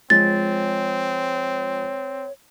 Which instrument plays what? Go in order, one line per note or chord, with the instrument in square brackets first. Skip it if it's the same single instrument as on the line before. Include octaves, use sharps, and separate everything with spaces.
[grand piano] F3 G#3 [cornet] C4 [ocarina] C#5 [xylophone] A6